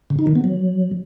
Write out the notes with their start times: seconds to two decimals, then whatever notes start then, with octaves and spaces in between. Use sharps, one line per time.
0.10 C#3
0.19 D#4
0.27 D#3
0.35 B3
0.44 F#3